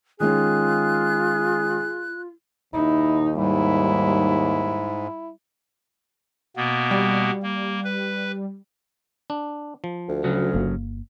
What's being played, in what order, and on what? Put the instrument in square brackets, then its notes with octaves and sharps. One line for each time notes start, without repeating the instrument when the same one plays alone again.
[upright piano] D#3 G#3 C#4 [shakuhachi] F4 [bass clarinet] G#4 [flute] F#6
[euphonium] D#2 [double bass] D#4 [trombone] E4
[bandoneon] G#2 [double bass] G3 [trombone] E4
[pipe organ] B2 A#3 B3
[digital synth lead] G3
[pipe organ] A#3
B4
[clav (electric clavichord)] D4
F3
[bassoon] D2
[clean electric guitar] C#3 F#3
[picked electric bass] G1 A#3